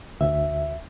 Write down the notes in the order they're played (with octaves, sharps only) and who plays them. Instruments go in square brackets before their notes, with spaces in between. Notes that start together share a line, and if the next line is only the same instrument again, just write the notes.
[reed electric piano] D2 E5